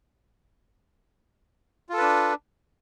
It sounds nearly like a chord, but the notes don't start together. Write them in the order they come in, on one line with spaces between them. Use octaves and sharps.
F4 A4 B4 D4